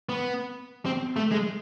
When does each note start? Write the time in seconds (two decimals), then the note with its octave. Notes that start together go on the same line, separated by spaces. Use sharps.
0.09 B3
0.85 C4
1.16 A3
1.32 G#3